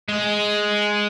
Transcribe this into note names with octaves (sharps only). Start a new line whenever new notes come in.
G#3